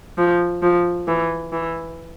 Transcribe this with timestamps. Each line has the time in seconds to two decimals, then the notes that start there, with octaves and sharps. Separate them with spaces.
0.18 F3
0.62 F3
1.08 E3
1.53 E3